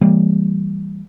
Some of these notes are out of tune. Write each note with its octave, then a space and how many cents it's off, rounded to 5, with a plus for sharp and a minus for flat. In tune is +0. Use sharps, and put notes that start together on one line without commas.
E3 +0 G3 +0 A#3 -35